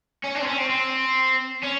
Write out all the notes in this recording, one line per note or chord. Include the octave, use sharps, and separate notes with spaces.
C#4
D4
C4
C#4
C4
C4
C#4